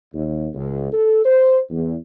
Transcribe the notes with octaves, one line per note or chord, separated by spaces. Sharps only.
D#2
C#2
A4
C5
E2